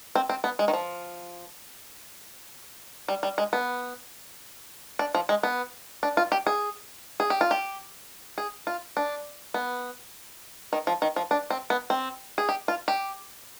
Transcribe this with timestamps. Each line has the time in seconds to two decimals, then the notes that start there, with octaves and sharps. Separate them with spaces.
0.15 C4
0.29 C4
0.44 B3
0.59 G#3
0.68 D#3
0.73 F3
3.08 G3
3.23 G3
3.38 G#3
3.53 B3
4.99 D4
5.15 F3
5.29 G#3
5.43 B3
6.03 D4
6.17 F4
6.32 G4
6.47 G#4
7.20 G#4
7.30 G4
7.41 F4
7.51 G4
8.38 G#4
8.67 F4
8.97 D4
9.54 B3
10.73 D#3
10.87 F3
11.02 D#3
11.16 F3
11.31 D4
11.50 C4
11.70 B3
11.90 C4
12.38 G#4
12.49 G4
12.68 F4
12.88 G4